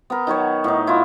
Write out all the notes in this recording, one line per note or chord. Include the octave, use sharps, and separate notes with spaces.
B3 A#4
D#3 F#3 F#4 C#5
A2 D#4
E4 F4